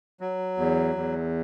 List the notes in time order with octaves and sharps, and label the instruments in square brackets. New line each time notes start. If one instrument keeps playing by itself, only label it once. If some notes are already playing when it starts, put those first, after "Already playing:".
[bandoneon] F#3
E2
E2